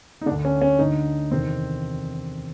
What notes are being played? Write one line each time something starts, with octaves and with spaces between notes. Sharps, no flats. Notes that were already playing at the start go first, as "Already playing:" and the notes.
D#4
D3 D4
D2
C#4
C#4
D2 D3 D#4
E2 C3 D#3 C4